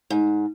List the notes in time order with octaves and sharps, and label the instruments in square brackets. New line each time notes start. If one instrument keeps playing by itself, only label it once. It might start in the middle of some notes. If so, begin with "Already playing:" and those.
[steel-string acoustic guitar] G#2